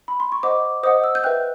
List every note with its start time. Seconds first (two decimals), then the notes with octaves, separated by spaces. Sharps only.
0.08 B5
0.20 C6
0.32 C#6
0.43 C5 D#5 F#5 D6
0.83 C5 D#5 F#5 D#6
1.04 E6
1.15 G6
1.24 B4 E5 G5 F#6